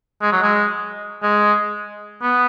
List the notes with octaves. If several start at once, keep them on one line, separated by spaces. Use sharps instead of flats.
G#3
F#3
G#3
G#3
B3